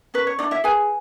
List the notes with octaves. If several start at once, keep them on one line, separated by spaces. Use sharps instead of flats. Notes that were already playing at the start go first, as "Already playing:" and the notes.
C#4 B4
C#5
D4 E4 D5
E4 E5
G#4 B4 G#5